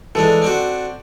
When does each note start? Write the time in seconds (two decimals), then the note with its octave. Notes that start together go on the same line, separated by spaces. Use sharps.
0.15 E3 G#3 D4 A4
0.42 C4 D4 F#4